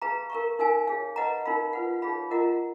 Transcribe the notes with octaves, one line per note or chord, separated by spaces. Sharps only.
G#4 B4 F5 A#5
A#4 F5 A#5 C#6
D#4 A#4 F5 G#5
G#4 C#5 F5
B4 D#5 F#5 A#5
D#4 A#4 F5 B5
F4 B4 F#5
D#4 G#4 C#5 F5 B5
F4 A#4 D#5 F#5 A#5